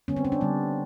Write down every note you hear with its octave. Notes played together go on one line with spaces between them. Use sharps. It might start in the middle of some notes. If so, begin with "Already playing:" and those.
D3 G3 B3 C#4
C4
C#4
D4
D3 G3 B3